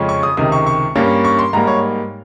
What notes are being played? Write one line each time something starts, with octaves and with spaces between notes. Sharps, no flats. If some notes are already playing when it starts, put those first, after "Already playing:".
Already playing: F2 C#3 G#3 C#4
C#6
D#6
C#2 C3 D#3 D#6
C#6
C#6
G2 G3 A#3 C#4
C#6
C6
G#2 G3 A#3 A#5
C#5